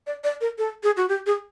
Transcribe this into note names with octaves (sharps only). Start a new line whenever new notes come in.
D5
D5
A#4
A4
G#4
F#4
G4
G#4